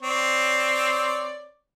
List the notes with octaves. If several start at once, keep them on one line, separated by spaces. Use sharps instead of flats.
C4 C#5 D5